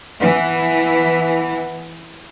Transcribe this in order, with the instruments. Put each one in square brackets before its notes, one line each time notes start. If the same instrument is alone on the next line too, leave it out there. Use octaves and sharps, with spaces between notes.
[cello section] E3 [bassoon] B3